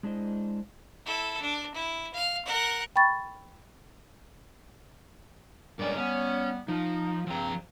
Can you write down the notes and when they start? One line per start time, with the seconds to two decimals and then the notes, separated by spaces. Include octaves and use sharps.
0.03 G#3 D4 E4 C5 D#5
1.06 E4 A4
1.42 D4
1.74 E4
2.14 F5 F6
2.45 A#4 F#5
2.96 G5 B5 C#6 A6
5.79 G2 G#3 C#4 A#4 D5
5.97 G3 B3 C#4
6.68 F3 D#4
7.27 G2 C#3 F3 C4 A#5